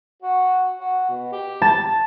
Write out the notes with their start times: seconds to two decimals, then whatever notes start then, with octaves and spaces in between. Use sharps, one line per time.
0.22 F#4
0.80 F#4
1.10 B2
1.32 G4
1.62 A5 A6